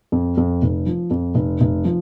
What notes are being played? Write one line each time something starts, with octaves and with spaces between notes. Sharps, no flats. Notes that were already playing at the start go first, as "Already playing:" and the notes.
F2
F2
F1
F3
F2
F1
F1
F3